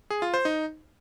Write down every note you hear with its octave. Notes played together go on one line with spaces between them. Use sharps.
G#4
F4
C5
D#4